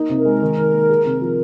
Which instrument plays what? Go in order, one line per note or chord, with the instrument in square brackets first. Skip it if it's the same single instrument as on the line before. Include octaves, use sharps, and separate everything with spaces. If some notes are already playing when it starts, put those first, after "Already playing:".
Already playing: [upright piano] A#3 D#4
C3
[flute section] A#4
[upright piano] G#3
D#3
D#3
A#3
G#4
C3
F3